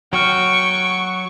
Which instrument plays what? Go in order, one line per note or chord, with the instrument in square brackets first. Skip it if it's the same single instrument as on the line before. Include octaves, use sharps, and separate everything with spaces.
[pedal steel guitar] F#3 F#4 F6 [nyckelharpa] G5 [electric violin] C#6